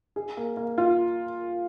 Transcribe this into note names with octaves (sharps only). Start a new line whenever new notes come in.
G#4
A#3
A#3
F4